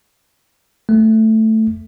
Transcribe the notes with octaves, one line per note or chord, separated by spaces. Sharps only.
A3